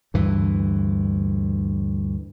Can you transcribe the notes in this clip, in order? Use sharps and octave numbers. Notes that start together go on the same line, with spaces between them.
D2 G2 E3